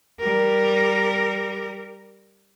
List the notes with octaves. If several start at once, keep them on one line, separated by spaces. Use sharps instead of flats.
G3 A#4